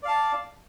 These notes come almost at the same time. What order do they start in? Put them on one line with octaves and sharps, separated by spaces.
D5 F5 A5